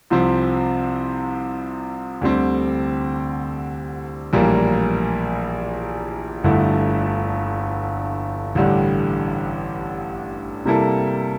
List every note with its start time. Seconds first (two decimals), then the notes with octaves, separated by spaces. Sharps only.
0.10 C2 C3 F3 C4
2.21 D2 D3 G3 C4 G4
4.33 A#1 A2 E3 G3 A#3
6.44 G1 G2 D3 A3 E4
8.55 A1 G2 D3 G3
10.65 C3 G3 A#3 E4 A4